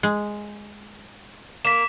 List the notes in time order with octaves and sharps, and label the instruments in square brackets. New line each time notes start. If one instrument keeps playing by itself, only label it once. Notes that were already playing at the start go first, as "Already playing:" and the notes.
[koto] G#3
[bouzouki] A#3 [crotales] B6 E7